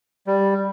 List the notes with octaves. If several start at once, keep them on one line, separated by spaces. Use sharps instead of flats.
G3